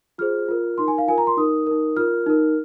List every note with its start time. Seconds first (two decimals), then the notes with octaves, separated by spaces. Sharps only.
0.18 F4 G#4 C5 F6
0.48 F4 A#4
0.78 D#4 A#4 C6
0.88 G#5
0.98 F5
1.08 F4 A#4 G#5
1.18 A#5
1.27 C6
1.37 D#4 A#4 D#6
1.67 D#4 A#4
1.97 F4 A#4 F6
2.26 D#4 A#4